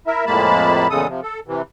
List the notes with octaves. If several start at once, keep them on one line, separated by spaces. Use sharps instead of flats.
E4 A#4 E5
F2 A2 G#3 A#3 A5 B5
E2 A#2 C#3 G#3 A4 D#6
C3 F3
A4
C3 E3